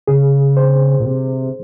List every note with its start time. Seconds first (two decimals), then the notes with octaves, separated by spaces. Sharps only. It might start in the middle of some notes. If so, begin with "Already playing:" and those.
0.08 C#3 G#4
0.57 C5
1.00 A#2
1.05 C3